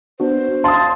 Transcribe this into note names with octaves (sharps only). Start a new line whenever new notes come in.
B3 D4 F#4 C5
F5 A5 C6 D#6